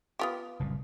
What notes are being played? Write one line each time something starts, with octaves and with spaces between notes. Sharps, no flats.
B3 F4 G4
F#1 C2 A#2